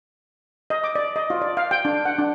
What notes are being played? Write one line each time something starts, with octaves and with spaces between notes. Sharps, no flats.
D#5
D6
D5
D#5
F4
D5
F5
G5
D4
F#5
D4